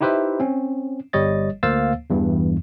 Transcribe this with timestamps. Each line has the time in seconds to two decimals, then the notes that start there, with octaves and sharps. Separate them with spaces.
0.01 D#4 E4 G4 B4 C5 E5
0.40 C4 C#4
1.13 G1 G3 C#5 D#5 A6
1.63 D2 A#3 C5 F5 E6 A6
2.10 E2 G2 E3